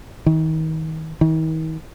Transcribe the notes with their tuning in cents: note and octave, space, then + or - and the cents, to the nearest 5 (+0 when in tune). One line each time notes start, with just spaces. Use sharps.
D#3 +35
D#3 +45